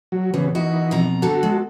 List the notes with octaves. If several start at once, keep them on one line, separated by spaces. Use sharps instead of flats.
F#3
E2 C#3 B3
E3 D#4 F#4
F2 B2 A#5
D3 G3 F#4 A4
G#3